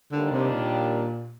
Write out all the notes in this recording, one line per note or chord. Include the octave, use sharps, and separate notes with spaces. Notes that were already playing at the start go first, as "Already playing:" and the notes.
D#2 D3 D#3 G3 A#3 D4
C3
A#2